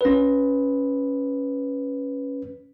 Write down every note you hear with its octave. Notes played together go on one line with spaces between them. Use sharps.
C#4 B4